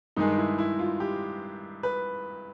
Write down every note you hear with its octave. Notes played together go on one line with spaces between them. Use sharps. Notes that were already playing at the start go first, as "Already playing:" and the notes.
G2 D#3 G#3 D#4
E4
E4
F4
G4
B4